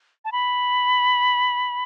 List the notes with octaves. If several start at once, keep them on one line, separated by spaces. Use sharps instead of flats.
A5
B5